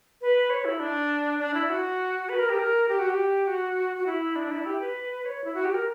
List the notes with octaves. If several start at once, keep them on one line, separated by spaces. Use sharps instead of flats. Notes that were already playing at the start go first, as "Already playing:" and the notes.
B4
C#5
E4
D4
D4
E4
F#4
B4
A#4
G4
A#4
G4
F#4
G4
F#4
F#4
E4
D4
E4
G4
B4
C#5
E4
F#4
G4
A#4